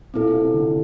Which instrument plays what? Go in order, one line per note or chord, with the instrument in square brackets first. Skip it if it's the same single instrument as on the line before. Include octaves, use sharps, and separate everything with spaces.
[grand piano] A#2 [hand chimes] C4 E4 A4
[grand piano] C3
D3